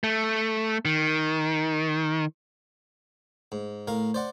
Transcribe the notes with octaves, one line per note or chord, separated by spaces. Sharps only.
A3
D#3
G#2
A2 A#4 F5
C5 D5 F#5